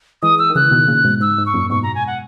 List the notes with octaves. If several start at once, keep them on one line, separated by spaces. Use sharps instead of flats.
E3 G#3 D#6
E6
D#3
C#3 E3 F#6
B2 D#3
A#2 C#3
G#2 B2
G#2 E6
G#2
C#6
F#2 A#2
G#2 B2 C#6
A#5
G#5
F#5